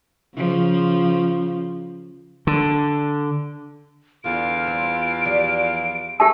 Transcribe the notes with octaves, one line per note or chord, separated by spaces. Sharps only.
C#3 F3
D3
E2 D3 F4 F5 D7
C4
F3 G4 D5
G#3 G4 E5 A5 E6